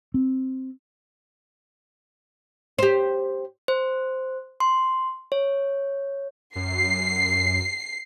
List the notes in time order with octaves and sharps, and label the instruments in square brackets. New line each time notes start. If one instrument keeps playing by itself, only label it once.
[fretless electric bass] C4
[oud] G4 C5
[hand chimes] C5
C6
C#5
[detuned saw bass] F#2 [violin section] C7